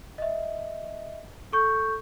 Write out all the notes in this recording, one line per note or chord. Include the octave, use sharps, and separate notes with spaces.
D#5 E5
A4 C#6 G6